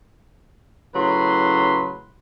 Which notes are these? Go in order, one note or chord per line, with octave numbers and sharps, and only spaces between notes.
A2 C#3 F#3 B4 C6